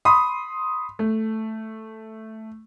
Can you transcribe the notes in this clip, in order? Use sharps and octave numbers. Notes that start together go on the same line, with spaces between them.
B5 C6 D#6
A3